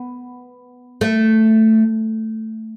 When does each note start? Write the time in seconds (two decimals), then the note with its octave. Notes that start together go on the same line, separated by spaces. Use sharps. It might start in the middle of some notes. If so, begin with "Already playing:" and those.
Already playing: B3
1.01 A3